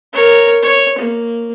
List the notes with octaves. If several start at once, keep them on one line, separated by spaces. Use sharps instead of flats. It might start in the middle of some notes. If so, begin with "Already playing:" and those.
A#4 C#5
C#5
A#3